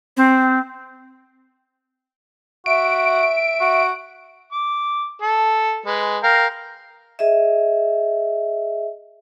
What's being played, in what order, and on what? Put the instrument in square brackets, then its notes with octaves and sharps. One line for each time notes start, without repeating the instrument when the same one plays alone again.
[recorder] C4
[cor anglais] F#4 [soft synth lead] E5 [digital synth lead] D7
[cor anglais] F#4
[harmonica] D6
A4
G#3 B4
A#4 F5 G5
[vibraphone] G#4 D#5 E5